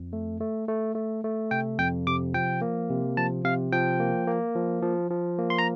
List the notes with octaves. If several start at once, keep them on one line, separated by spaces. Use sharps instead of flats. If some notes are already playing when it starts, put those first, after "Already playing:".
Already playing: F2
A3
A3
A3
A3
A3
C3 G5
F2 G5
C3 D6
F3 G5
A#3
C3
F3 A5
C3 F5
F3 G5
A#3
A#3
F3
F3
F3
A#3
C6
A#5